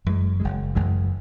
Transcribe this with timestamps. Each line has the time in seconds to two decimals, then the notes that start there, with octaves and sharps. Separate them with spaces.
0.05 F#1 F#2 E3 G#3
0.40 F#1 F#2 E3 G#3
0.75 F#1 F#2 E3 G#3